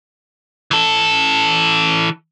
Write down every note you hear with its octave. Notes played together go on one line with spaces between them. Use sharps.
E3 A4